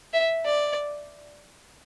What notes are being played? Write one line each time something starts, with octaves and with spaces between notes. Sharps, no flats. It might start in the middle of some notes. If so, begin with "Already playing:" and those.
E5
D5